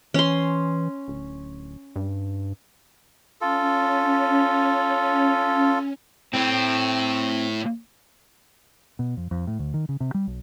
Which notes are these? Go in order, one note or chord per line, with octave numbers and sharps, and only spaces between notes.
E3 C#4 C6
D1
G2
C#4 F4 A4
A2 C4
B2
F2
F2
A2
D2
D#3
C#3
C3
G3
B1